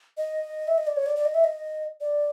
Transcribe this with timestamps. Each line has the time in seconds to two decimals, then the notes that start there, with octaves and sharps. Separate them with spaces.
0.18 D#5
0.68 E5
0.78 D#5
0.87 D5
0.97 C#5
1.06 D5
1.16 D5
1.25 D#5
1.34 E5
1.44 D#5
2.01 D5